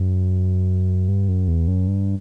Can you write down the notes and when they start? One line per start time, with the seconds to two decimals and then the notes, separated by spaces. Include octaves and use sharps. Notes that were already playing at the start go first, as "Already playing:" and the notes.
Already playing: F#2
1.08 G2
1.28 F#2
1.48 E2
1.68 F#2
1.87 G2